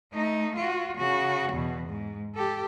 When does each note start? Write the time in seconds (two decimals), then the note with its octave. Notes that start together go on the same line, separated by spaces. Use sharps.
0.14 A3 D#4
0.56 F4 F#4
0.97 C#3 F#4
1.53 E2 B2
1.89 G#2
2.36 G4 A4